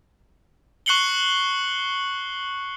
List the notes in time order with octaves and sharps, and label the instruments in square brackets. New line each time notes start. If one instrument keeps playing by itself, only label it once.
[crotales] C#6 F#6 C7 C#7 F#7 G7